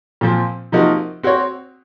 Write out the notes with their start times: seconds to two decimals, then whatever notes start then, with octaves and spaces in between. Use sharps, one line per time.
0.21 A#2 F3 C4
0.72 C3 F3 A#3 D#4 F#4
1.23 C4 F#4 C#5